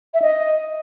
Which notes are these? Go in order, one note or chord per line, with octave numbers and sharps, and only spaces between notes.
E5
D#5